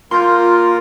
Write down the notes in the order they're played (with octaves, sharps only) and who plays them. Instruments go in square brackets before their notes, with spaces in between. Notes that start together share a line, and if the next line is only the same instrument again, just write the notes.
[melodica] A#3 A#4 [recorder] F4 [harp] C6 G6